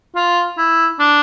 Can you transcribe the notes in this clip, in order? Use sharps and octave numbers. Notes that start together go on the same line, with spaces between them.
F4
E4
D4